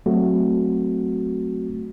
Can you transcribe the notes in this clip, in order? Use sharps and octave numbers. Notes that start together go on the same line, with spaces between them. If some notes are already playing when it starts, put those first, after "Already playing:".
F#3 A3 C4 F#4